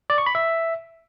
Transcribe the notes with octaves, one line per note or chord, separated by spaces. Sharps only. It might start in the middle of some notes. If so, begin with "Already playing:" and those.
D5
C#6
B5
E5